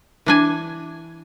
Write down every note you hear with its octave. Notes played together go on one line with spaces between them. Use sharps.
E3 D4 G#5